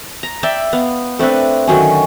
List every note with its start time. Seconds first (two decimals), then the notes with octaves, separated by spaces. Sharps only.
0.23 A#5
0.43 D5 E5 G5
0.73 B3 F5
1.19 A3 C4 D4 B4
1.67 D3 D#3 F#3 C#4